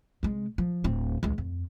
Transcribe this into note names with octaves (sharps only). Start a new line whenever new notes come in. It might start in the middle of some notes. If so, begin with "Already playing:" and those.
C3 G#3
F3
D1 C4
C#2 G#3
F2